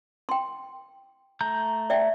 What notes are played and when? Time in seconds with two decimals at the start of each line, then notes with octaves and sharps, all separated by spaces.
0.29 G5 C6
1.41 A3 A#5 G6
1.90 D5 E5 G5